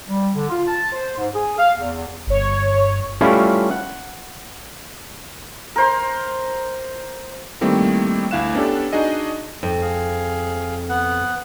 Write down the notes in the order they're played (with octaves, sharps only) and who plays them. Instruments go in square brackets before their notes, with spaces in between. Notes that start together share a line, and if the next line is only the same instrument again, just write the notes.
[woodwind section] G3
D3
F4
A5
C5
G#2
G#4
F5
E2
[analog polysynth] G1 C#5
[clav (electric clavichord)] G3 A3 C#4 E4 F4
F#5
[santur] A#4 C5 C6
[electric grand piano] D#3 G3 A3 A#3 C4 E4
D2 E4 F5 F#6 E7
B3 C#4 D4 G4 A4
D4 D#4 F#4 G#4 D#5
[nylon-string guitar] F2
[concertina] G#4 F5
B3 F#5